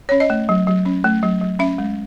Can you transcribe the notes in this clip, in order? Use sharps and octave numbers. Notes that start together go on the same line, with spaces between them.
C#4 C#5
D#5
A3
F#3
F#3
C#4
A3
F#3
F#3
C#4 E5
G#3